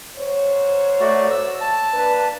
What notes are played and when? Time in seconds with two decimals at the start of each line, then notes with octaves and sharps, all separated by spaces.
0.17 G#2 C5 C#5
1.00 A3 F#4 D5
1.31 E6
1.61 A5
1.93 A#3 D4 B4